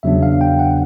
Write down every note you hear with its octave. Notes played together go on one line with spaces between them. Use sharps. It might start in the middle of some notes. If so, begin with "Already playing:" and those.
E2 C#3 F#3 B3 D4 E5
F5
G5
F#5